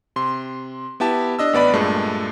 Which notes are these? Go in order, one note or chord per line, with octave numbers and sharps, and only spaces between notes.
C3 C6
B3 E4 G4 A5
D4 D#5 E6
A1 B3 D5 B5
G2 A#2 G#3 A3